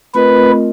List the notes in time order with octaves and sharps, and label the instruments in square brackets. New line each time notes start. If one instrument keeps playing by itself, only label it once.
[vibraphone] A3 C4 F4 A#4 D#5 [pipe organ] B4